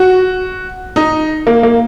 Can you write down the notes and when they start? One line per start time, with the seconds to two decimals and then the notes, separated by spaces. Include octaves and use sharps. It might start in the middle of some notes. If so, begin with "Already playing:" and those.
Already playing: F#4
0.96 D#4
1.47 A#3
1.63 A#3